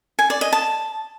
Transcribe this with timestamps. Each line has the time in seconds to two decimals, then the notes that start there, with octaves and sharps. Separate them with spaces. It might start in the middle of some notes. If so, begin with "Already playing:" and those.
0.19 G#5
0.30 D5
0.41 D#5
0.53 A5